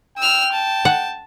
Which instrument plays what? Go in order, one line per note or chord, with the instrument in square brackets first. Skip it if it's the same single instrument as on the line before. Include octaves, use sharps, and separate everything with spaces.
[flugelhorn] G5 [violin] E6 F6
[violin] A5
[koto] F#5